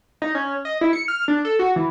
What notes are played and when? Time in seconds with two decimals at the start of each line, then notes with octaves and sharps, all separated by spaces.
0.22 D#4
0.35 C#4
0.65 D#5
0.81 E4
0.93 C#7
1.08 F6
1.28 D4
1.45 A4
1.59 F#4
1.76 E3